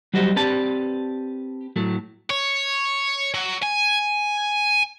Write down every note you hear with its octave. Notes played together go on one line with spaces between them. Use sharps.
F#3 G3 F#4 C5 D#5
C4 G4 B4 D5 A5
A2 F#3 A3
C#5
F#3
G#5